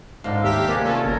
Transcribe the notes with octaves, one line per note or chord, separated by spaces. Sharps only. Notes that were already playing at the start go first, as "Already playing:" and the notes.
G#2 D3 D#4 F5
D#2 G4 A#4 E5 F5 B6
C3 A#3 D4 G#4 D#5 E5
C#4 F4 A4
G1 A4 A#4 C#5